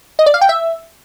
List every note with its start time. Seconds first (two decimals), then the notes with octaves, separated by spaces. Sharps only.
0.19 D#5
0.26 D5
0.34 F5
0.41 G5
0.49 E5